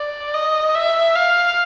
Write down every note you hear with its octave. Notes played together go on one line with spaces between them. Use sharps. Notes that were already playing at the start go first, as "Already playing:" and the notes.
Already playing: D5
D#5
E5
F5